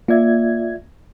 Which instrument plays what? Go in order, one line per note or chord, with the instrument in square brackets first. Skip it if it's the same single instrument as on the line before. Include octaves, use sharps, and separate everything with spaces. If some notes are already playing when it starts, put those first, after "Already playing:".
[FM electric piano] A#3 G#6 [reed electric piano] F4 D5 E5